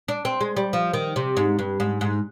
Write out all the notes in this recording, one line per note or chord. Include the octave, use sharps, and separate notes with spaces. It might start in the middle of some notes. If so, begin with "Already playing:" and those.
D4
C4
G#3
G3
F3
D#3
C3
G#2
G2
G#2
G#2